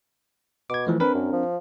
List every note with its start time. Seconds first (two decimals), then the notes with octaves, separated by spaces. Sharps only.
0.70 B2 D6 G#6
0.87 E3 F3 A3
1.00 C4 D4 A#4 B4
1.14 F#2
1.33 F3